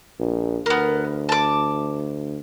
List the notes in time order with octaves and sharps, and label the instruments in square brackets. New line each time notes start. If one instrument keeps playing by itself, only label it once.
[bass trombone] A#1
[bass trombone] D2 [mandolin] B3 A#4
[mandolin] A5 D6